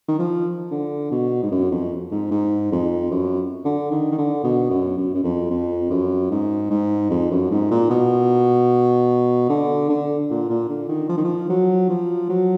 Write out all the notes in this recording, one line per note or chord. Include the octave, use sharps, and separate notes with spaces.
D#3
F3
D3
B2
G#2
F#2
F2
G#2
G#2
F2
F#2
D3
D#3
D#3
D3
B2
F#2
F#2
F#2
F2
F2
F#2
G#2
G#2
F2
F#2
G#2
A#2
B2
D3
D3
A#2
A#2
D3
D#3
F3
D#3
F3
F#3
F3
F#3